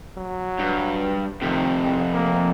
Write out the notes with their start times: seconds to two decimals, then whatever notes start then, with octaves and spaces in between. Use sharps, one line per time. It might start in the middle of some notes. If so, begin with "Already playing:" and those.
0.18 F#3
0.59 G2
1.42 F2 C3 D#3
1.85 C2
2.14 A#3